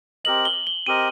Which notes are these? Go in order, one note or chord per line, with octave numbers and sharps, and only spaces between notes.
C4 G4 A#4 D#5 F#7
G7
G7
C4 G4 A#4 D#5 D#7